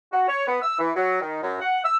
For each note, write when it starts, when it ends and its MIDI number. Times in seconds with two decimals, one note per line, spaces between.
0.12 0.25 66
0.28 0.42 73
0.47 0.59 59
0.62 0.78 88
0.78 0.90 52
0.96 1.19 54
1.21 1.41 51
1.42 1.56 42
1.60 1.83 78
1.84 1.97 88